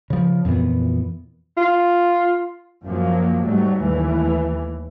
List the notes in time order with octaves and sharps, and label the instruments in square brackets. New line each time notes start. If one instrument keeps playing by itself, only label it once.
[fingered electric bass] C#3 F3
F2 A#2 E3 B3
[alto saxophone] F4
[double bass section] F#2 F3 F#3 A#3
G#2 F#3 G3 A3
D#2 E3 A3